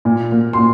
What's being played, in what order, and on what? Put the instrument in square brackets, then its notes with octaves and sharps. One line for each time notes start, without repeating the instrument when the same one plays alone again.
[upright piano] A#2
A#3
C6
A#2